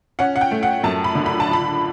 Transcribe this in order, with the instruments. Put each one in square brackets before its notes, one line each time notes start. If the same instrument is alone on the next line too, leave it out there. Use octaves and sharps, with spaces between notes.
[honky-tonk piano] C#4 F#5
F#5
G5
A3
F#5
F#2 A5
B5
D3
B5
A5
C#2
B5